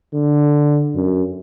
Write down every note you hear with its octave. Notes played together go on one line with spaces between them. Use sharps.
D3
F#2